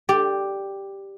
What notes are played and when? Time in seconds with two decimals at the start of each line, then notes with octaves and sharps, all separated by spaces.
0.09 G4 D5